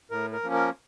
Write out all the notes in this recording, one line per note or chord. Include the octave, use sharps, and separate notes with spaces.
A2 A#4
A#4
F3 A#3 C#4
A#4